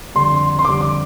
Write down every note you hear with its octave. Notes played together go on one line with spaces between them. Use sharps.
F2 D3 G3 C6
C6
F2 D3 G3 D6
D6